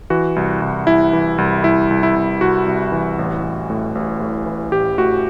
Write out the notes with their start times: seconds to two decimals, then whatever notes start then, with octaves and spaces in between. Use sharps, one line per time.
0.10 E3 F#4
0.36 C2
0.62 C2
0.87 C2 E4
1.13 E3
1.38 C2
1.64 C2 E4
1.91 C2
2.03 E4
2.16 C2
2.41 C2 F#4
2.66 C2
2.92 E3
3.19 A1
3.43 A1
3.70 A2
3.95 A1
4.20 A2
4.46 E3
4.72 A1 G4
4.98 A2 F#4